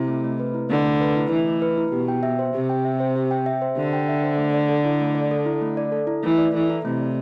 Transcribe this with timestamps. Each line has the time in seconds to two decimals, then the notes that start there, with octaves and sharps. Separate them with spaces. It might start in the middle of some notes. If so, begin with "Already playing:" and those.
Already playing: C3 E4
0.08 A3
0.24 A3
0.39 B4
0.54 E4
0.69 D3 A3
0.85 A3
1.01 B4
1.16 E4
1.31 E3 A3
1.47 A3
1.62 B4
1.77 E4
1.92 B2 G4
2.08 G5
2.23 E5
2.39 C5
2.54 C3 G4
2.69 G5
2.85 E5
3.00 C5
3.15 G4
3.31 G5
3.46 E5
3.62 C5
3.77 D3 G4
3.93 G5
4.08 E5
4.23 C5
4.38 A3
4.54 D5
4.69 A4
4.85 E4
5.00 A3
5.15 D5
5.31 A4
5.46 E4
5.62 A3
5.77 D5
5.92 A4
6.07 E4
6.23 E3 A3
6.38 D5
6.54 E3 A4
6.69 E4
6.85 C3 A3
7.00 D5